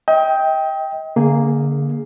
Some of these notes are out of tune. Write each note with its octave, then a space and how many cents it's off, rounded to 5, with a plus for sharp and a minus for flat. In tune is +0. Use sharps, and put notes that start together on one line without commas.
D#5 +35 G5 +0
D3 -25 A#3 -5 G#4 +0